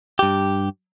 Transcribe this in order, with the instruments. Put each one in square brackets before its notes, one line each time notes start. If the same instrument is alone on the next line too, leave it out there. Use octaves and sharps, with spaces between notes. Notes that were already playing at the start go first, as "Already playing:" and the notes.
[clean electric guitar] G2 G4